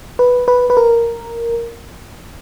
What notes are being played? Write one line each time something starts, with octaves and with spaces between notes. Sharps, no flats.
B4
B4
B4
A#4